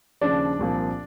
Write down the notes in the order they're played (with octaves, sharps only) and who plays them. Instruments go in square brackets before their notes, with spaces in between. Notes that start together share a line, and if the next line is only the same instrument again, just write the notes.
[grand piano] D#2 C#3 F3 D4 D5
C2 A#2 F3